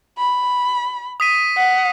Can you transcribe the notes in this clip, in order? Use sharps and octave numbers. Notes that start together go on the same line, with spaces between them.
B5
D#6 B6 D#7
F#5 B6